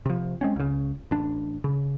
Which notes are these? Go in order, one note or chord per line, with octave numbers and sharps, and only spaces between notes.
C3 F3
G#3 C4 C#4
C#2 C#3
A1 D4
C#3